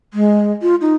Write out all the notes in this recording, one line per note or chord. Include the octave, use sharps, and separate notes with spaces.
G#3
F4
D#4